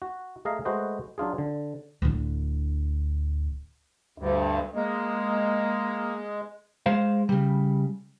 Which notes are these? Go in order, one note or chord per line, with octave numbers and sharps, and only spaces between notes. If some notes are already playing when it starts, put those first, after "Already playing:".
F#4
A3 G#4 D#5 F5 A#5
G#3 A3 F#4 B4 C5 D#5
F#3 D4 F4 G#4
D3
D1 D3
D2 G2
G#3 A#3
G#3 C5 F5
C#3 G3